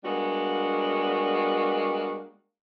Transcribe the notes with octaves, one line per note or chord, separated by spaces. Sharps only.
G3 G#3 A#3 B3 D4 F#4